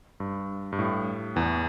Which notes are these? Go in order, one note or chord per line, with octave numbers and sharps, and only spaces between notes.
G2
G2
A2
E2 E3